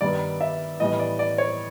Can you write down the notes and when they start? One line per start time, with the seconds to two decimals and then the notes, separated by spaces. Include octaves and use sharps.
0.01 G2 D#3 G3 B3 D5
0.41 E5
0.80 A2 E3 G3 B3 D#5
0.99 D5
1.19 D5
1.38 C#5